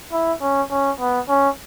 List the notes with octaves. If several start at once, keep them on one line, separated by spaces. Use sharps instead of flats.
E4
C#4
C#4
B3
C#4